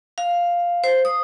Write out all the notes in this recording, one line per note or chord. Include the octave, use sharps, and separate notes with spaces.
F5
C5
D#6